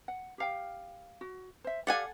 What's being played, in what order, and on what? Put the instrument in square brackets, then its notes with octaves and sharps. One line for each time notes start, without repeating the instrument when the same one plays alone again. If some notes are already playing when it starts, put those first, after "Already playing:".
[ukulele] F#5
G4 F5 G5
F#4
C5 E5
[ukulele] G4 D5 F5 [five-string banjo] A4 F#5 G#5